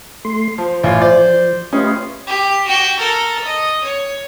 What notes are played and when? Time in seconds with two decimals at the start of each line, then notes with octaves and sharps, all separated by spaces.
0.25 A3 C6
0.58 F3 C5
0.83 A1 F4 C#5
1.01 F3 C5 D5
1.73 A3 C#4 F4 G4 B4 D#5 F5
2.27 G4
2.67 F#4 G5
2.99 A4 A#4
3.44 D#5
3.83 C#5